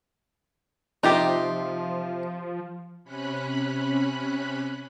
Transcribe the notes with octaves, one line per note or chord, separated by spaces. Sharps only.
C3 F3 D#4 F4 G4
C3 C#4 B5 F#6